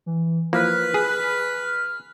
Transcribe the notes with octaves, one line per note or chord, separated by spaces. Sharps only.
E3
E3 F3 A#3 B4 F6
G#4